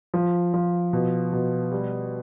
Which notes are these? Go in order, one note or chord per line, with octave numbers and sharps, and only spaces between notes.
F3
F3
B2
B2
G3